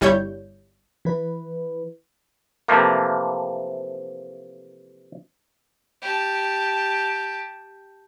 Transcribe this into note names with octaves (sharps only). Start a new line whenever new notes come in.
G1 G3 E4 C#5 G6
E3 E4 B4
C3 E3 F3 A3 A#3
G4 A5